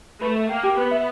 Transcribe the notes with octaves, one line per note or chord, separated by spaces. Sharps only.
A3 B4
E5
A#3 G5
G4
B3 B4
E5